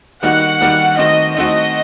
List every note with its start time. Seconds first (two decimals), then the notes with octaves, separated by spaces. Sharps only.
0.23 D#3 G3 A#3 D#4 F#4 F#5
0.61 D#3 G3 A#3 D#4 F#4
0.98 D#3 A3 C4 F#4 D#5
1.37 D#3 A3 C4 F#4 D#5